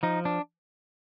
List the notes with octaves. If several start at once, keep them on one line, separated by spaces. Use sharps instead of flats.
F3 D#4
D4